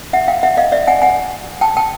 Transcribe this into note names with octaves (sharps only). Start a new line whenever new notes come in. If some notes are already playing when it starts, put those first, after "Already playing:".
E5 F#5
F5 G5
E5 F#5
D#5 F5
D5 E5
F#5 G#5
F#5 G#5
G5 A5
G5 A5